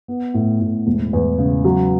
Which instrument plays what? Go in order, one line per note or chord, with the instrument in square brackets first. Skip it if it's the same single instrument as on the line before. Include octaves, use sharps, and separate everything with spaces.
[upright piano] B3
A2
A2
E1
E2
C#3
F#3